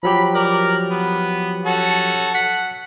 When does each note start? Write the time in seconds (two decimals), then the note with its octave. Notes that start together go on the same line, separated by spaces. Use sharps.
0.03 F3 F#3 G4 B5
0.35 A#4 D5
0.90 B3
1.66 C#4 F#4 A4
2.34 F#5 B6 C#7